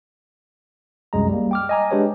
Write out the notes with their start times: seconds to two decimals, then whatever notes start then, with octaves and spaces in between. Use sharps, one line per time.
1.13 C2 F#2 G#3 A#5
1.29 G3 A#3
1.51 G5 D6 F6
1.69 D#5 G#5 A#5
1.91 G#3 D4 G4 B4 C#5